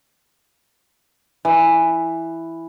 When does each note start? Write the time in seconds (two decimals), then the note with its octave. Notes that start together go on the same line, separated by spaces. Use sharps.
1.45 E3